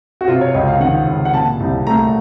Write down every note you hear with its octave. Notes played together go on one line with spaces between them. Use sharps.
F#4
C3 F4
C#5
C#2 D#5
F5
D#3 F#5
C#2
F#5
A#2 A5
C2
A3 A#5